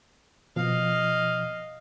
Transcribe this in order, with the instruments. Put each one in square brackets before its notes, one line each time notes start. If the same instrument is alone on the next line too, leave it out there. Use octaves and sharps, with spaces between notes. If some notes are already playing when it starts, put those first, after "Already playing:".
[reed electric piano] B2 F3 [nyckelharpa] D#5 F5